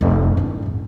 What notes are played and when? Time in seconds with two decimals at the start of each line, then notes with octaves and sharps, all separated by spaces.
0.01 F1 F2
0.37 G2 E4
0.62 A1 E2